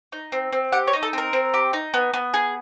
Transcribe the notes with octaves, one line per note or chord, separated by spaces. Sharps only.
D#4
C4
C4
G4 F#5
C#5
D#4
A4
C4 A#4
C4
G4
D#4
B3
B3
G#4